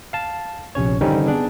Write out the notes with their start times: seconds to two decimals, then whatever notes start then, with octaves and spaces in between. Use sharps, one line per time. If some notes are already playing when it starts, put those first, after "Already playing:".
0.13 F5 A5
0.75 A#1 C3 C#4 C#5
1.01 D3 D#3 G3 C4 C#4 D#4
1.27 B3 D4 G#4